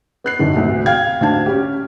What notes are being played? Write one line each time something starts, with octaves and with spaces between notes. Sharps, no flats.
B3 F#6 C7
F#2 D3 D#3
D2 C3
F5 G5 F6 G#6
D2 D4 F5 A5 G#6
C#4 G4